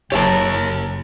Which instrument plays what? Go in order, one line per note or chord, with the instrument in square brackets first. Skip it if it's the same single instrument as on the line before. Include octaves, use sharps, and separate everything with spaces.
[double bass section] F#1 [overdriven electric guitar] G4 A#4 [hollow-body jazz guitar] C#5 E5 A5